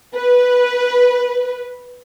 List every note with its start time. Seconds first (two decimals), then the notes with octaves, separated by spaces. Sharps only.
0.15 B4